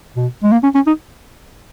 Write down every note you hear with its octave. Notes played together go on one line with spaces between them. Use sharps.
B2
G#3
A#3
C#4
C#4
D#4